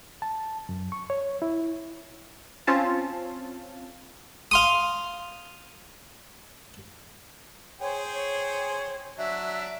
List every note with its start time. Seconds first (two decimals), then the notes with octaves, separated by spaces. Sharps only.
0.22 A5
0.69 F#2
0.92 C#6
1.10 C#5
1.42 E4
2.67 C4 C#4 F4 A5
4.51 F5 C6 D#6
7.81 G#4 C5 C#5 G5
8.13 C#5
9.18 F#3 D4 E5